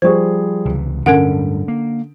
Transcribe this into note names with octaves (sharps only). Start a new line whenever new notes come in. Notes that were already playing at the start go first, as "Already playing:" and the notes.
F3 G3 G#4 C5 C#6
C#2 C3 E3
D1 G2 D3 G3 C#4 A#4 F#5 D7
A#3